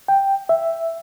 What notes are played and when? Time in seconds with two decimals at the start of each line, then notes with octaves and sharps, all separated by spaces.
0.08 G5
0.49 E5